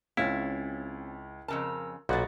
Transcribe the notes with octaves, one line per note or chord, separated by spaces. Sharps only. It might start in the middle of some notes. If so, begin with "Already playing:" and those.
C#2 C4 C#4 E4 C#5 F5 A6
F2 C#3 A#4 A5 A#5 E6
B1 A#2 F#3 F#4 D#5 B5 F#6 A6